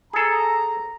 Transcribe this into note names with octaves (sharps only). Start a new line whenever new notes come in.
G#4 A4 A#5